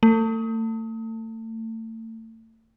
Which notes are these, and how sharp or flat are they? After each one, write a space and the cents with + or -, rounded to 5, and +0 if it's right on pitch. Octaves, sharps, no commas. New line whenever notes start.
A3 +35